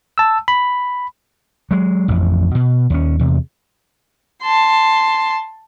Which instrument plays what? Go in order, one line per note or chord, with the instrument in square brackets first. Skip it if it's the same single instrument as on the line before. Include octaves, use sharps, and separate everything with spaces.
[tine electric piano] A5 E6
B5
[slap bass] F#3 G#3
A1 F2
B2
D#2 C#4
E2 C3
[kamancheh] A5 C6